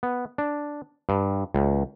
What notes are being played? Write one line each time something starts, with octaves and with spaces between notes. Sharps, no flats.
B3
D4
G2
C#2